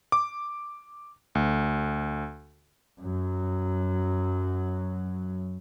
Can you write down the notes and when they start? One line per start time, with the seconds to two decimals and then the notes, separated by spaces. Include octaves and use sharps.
0.12 D6
1.35 D2
3.01 F#2 F#3